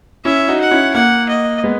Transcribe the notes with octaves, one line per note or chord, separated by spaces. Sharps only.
C#4 E4 E5
D#4 F#4
F#5
C#4 E4
A#3 F#5
D#5
G#3 B3